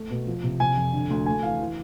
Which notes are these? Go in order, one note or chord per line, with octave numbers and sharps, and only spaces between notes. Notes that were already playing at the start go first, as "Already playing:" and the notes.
Already playing: A3
B2
F3
C3
C3 G#5
F2
D3
D2
A3 G#5
E3 F5
E3